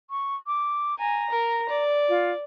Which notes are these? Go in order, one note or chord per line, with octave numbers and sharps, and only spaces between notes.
C#6
D6
G#5 A#5
A#4
D5
F4